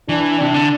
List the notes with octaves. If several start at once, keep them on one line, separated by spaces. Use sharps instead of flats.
E3 D4
C3 D4
D3